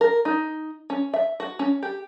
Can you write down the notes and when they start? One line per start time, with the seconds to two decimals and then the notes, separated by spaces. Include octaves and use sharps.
0.01 A#4
0.25 D#4
0.90 C#4
1.14 E5
1.40 F#4
1.59 C#4
1.83 G4